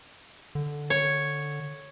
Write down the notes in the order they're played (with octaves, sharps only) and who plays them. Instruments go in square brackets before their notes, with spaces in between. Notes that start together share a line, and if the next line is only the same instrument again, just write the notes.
[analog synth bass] D3
[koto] C#5